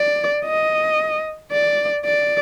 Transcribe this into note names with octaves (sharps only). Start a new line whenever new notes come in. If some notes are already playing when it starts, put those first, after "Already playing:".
Already playing: D5
D#5
D5
D5